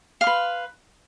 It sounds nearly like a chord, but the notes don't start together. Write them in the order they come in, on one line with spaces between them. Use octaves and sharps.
F5 C6 B4